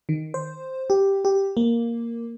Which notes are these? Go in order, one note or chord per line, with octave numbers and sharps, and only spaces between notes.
D#3
C5
G4
G4
A#3